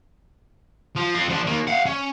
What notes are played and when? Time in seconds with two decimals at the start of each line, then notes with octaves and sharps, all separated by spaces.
0.96 F3
1.15 C4 F4
1.30 F3 D4
1.46 D#3 A#3
1.67 F5 F#5
1.86 C#4